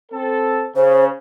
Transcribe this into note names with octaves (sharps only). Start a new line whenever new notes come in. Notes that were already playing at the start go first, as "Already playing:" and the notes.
C4 A4
C#3 C5